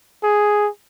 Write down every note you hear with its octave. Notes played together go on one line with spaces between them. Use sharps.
G#4